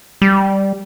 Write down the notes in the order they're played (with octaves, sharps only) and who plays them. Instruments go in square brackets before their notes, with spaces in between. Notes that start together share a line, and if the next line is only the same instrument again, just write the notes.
[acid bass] G3